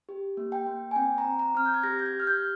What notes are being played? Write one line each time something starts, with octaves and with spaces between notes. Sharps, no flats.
G4
A#3
G5
A#3
G#5
C4 G5
A#5
C4
A#5
C4 F6
G6
G#6
G4 A#6
G6
G#6
G4
F6
G6